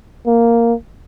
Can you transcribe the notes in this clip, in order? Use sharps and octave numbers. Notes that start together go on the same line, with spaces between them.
A#3